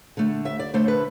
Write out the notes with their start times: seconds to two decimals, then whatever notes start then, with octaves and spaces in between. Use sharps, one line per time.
0.17 D3 A3
0.45 D2 E5
0.59 D5
0.74 D3 A3 C5
0.88 B4